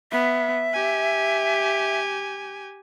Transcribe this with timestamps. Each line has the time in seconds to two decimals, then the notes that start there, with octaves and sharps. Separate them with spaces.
0.12 B3 E5
0.74 G4 G#5